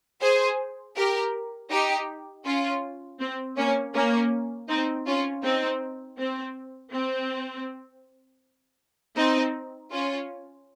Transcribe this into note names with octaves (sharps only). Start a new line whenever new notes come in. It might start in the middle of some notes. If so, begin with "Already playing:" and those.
G#4 C5
G4 A#4
D#4 G4
C#4 F4
C4
A#3 C#4
A#3 C#4
C4 D#4
C#4 F4
C4 D#4
C4
C4
C4 D#4
C#4 F4